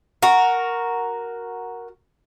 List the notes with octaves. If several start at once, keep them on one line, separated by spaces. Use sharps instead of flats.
F#4 A#4